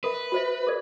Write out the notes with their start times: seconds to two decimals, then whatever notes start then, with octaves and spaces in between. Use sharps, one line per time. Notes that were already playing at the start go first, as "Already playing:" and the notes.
0.04 A#4 B4 E5
0.32 F#4 C5 E5
0.67 G#4 A#4 D5